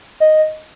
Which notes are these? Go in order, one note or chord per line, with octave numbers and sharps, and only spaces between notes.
D#5